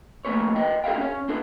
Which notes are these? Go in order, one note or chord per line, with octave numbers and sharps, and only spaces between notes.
F3 A3 A#3 C#4 B4 C#5
B4 D#5 G5
G#4 A#4 C#5 E5 F5 G5
C#4 C#5
D4 A4 B4